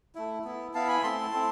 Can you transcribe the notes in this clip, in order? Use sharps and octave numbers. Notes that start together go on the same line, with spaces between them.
A3 E4
B3 E4
B3 E4 F5 A5
G#5 B5
A3 C4 E4 A5 C6
A3 C4 E4